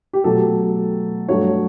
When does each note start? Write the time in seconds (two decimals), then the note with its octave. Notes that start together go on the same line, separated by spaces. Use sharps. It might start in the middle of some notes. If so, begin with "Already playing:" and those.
0.13 G4
0.24 B2 F#3 A3 A4
1.29 G2 F#3 A3 C#5